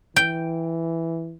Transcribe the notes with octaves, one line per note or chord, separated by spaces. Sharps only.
E3 G5